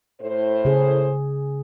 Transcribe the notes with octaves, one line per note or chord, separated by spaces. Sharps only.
A2 C5
C#3 G#4